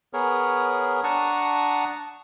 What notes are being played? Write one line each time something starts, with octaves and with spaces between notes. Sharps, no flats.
B3 G#4 A#4 C#5
D4 F#5 A5 A#5 C#6 D#6